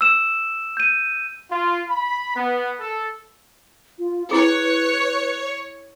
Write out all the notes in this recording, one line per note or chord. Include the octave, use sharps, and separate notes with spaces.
E6 E7
G6 D#7
F4
B5
B3
A4
F4
E4 G#4 B4 C#5